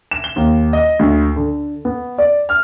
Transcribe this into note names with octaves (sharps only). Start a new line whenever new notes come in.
E7
G7
D#2
D#5
D2
D3
B3
D5
F6